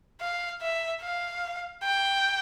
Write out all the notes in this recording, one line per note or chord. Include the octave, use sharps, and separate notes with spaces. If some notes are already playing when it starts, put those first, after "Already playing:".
F5
E5
F5
G5